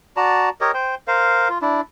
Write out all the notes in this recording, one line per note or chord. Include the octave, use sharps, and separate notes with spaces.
F#4 D5 A5 A#5
G4 A#4 C#5 D#5
C5 G5
A#4 C5 F5
F4
D4 E4